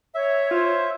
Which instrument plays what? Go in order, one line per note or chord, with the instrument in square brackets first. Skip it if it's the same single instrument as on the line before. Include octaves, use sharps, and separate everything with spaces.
[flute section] C#5 [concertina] E5
[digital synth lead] F4 [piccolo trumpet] C5